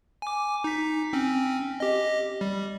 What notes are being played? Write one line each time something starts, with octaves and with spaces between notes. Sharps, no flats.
G#5 D6
D#4 B6
C4 C#4
G4 D#5
G3